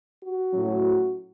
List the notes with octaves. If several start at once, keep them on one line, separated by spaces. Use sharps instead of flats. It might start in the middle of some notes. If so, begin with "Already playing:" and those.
F#4
A2 F#3 C#4